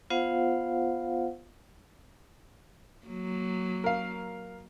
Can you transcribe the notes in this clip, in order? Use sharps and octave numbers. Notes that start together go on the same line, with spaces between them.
B3 F4 C5 F5 F#5
F#3 A#3
A#4 F5